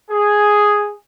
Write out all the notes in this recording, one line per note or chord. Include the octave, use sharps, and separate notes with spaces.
G#4